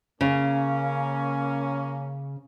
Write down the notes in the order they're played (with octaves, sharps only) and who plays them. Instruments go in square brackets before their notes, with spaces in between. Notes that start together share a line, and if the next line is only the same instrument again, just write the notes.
[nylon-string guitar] C#3 [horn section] A#3 C#4